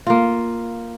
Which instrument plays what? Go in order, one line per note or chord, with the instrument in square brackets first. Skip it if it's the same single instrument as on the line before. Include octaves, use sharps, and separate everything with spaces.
[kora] A#3 F4